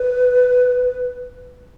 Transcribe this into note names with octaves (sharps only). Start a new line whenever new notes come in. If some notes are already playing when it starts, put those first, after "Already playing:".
Already playing: B4